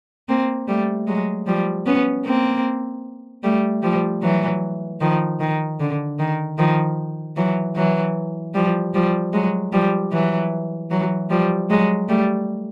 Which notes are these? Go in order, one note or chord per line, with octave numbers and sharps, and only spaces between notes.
A#3 C4
G3 A3
F#3 G#3
F3 G3
B3 C#4
A#3 C4
G3 A3
F3 G3
E3 F#3
D#3 F3
D#3
D3
D#3
D#3 F3
E3 F#3
E3 F#3
F3 G3
F3 G3
F#3 G#3
F3 G3
E3 F#3
E3 F#3
F3 G3
F#3 G#3
G3 A3